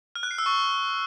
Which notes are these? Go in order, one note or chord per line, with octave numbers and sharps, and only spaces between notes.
F6
F#6
C7
E6
C#6